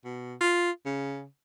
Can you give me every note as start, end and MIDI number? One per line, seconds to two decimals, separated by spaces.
0.05 0.34 47
0.41 0.71 65
0.85 1.25 49